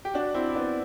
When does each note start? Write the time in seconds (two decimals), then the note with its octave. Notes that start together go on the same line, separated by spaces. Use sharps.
0.05 G4
0.14 D4 F#4
0.34 C4 E4
0.49 E4
0.55 B3 D4